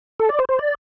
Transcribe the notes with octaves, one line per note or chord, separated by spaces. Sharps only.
A4
D5
C5
C5
D5